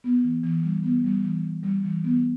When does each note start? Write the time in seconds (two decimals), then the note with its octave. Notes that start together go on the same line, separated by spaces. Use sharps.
0.04 B3
0.24 E3
0.43 E3
0.63 G3
0.83 B3
1.04 G3
1.24 E3
1.44 E3
1.63 G3
1.85 E3
2.04 B3